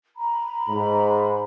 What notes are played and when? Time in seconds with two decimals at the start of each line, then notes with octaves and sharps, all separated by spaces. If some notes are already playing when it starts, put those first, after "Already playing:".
0.17 A#5 B5
0.69 G#2